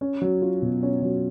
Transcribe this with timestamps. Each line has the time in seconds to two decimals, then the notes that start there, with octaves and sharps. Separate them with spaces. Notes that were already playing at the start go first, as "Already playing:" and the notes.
0.01 C#4
0.22 F#3
0.42 F4
0.62 B2
0.83 C#4
1.02 F#3